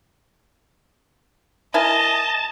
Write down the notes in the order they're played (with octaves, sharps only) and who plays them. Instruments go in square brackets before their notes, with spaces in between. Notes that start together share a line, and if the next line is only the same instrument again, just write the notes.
[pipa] E4 A#4 G#5 [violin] D#5 [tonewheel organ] A5